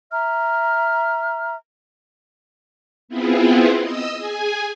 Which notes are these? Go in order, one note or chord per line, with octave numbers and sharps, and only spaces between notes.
E5 A#5 F6
B3 C4 E4 F4 G#4
D#5 D#6 E6
G#4 G#5